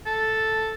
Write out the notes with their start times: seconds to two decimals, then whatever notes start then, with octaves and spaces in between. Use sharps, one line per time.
0.07 A4